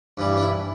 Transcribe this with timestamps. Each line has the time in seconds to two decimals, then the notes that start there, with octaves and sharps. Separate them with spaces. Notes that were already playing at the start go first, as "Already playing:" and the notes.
0.17 G2 E3 G3
0.37 D4
0.41 E4